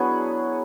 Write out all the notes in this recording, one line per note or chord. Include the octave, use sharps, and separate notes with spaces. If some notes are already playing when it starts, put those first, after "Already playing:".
Already playing: F#3 B3 D4 E4 F#4 G#4 B4